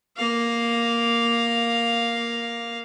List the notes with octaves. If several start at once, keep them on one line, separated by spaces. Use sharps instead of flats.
A#3 F5